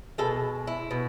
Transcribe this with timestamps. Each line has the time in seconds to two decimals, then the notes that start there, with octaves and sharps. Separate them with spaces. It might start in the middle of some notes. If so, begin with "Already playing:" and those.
0.18 B2 G#3 A4
0.67 E4
0.91 B2